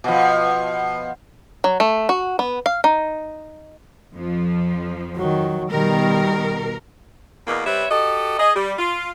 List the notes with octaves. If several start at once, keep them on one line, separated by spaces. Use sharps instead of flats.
B2 F3
F#3
A3
F#4
B3
F5
D#4
F2 F3
D#3 F#3
B2 D#3 G3 A#4
E2 B2 A#3
G3 C4 B4 C#5 E5
F#4 G4 A4 D#5
G#4 D#5
G3
F4